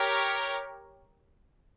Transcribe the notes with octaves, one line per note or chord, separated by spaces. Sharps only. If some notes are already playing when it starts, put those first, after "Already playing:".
Already playing: G4 A#4 C#5